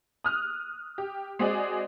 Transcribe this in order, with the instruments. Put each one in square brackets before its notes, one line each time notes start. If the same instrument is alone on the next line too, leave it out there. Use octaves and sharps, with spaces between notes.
[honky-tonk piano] D#6 F6 F#6
G4
G#3 C4 F#4 G#4 D5 D#5